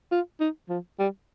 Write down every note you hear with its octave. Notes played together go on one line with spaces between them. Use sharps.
F4
D#4
F3
G3